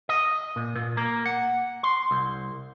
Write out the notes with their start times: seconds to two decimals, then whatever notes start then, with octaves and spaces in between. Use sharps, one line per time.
0.09 D#5
0.56 A#2
0.75 A#2
0.97 A#3
1.26 F#5
1.83 C6
2.11 C2